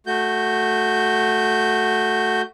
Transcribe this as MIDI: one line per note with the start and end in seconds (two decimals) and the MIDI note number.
0.07 2.42 57
0.07 2.42 66
0.07 2.42 91